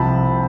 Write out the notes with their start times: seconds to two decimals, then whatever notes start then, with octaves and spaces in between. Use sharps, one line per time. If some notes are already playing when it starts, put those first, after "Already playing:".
Already playing: C2 C3 F3 A5 B5